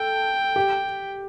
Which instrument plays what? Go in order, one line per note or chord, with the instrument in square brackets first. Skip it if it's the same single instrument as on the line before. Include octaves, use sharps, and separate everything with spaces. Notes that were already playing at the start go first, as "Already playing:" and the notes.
Already playing: [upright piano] A4 [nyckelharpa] G5
[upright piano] G4